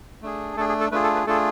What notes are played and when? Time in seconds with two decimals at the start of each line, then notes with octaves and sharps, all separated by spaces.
0.22 A3 D4 G#4
0.57 A3 D4 G#4 A4
0.69 G#4
0.81 A4
0.92 A3 D4 F4 G#4 B4
1.04 A4
1.15 B4
1.27 A3 D4 F4 G#4 A4